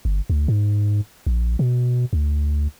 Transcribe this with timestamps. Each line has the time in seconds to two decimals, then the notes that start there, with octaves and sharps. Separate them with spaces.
0.05 G1
0.30 D2
0.48 G#2
1.26 A#1
1.59 B2
2.13 D2